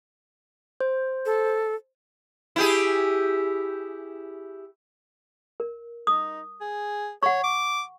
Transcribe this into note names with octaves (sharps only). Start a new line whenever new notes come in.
C5
A4
E4 G4 G#4
A#4
D#4 D#6
G#4
C#5 F#5 C#6
D6